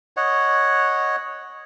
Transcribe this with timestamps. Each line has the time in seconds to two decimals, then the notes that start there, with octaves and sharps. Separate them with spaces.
0.17 C#5 D#5 F#5